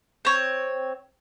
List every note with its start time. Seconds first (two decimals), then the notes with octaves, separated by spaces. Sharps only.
0.25 C4 C#5